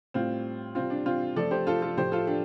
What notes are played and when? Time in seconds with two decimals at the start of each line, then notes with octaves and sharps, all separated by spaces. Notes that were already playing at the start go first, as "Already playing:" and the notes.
0.14 A2 G3 C4 F4
0.75 C3 G3 C4 F4
0.90 D4
1.06 C4 F4
1.36 C3 F3 A3 A4 D5
1.51 G4 C5
1.67 F4 A4
1.82 F4 A4
1.97 A2 F3 A3 G4 C5
2.12 F4 A4
2.27 D4 G4